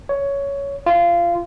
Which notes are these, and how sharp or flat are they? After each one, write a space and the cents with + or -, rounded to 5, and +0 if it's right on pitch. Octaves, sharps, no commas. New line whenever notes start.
C#5 +10
F4 -20